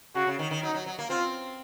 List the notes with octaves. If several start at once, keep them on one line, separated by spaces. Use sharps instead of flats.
C#3 F#4
C#3
D#3
D#3
F#3 D#4
F#3
F#3
A#3
C4 F4